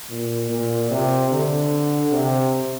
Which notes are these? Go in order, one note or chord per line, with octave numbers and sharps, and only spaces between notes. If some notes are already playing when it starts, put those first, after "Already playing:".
A#2
A#2
C3
D3
C3